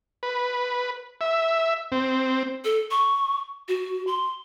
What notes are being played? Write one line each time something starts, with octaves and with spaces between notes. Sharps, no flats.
B4
E5
C4
A4
C#6
F#4
C6